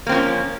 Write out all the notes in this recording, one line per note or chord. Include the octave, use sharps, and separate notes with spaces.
F3 A#3 C4 C#4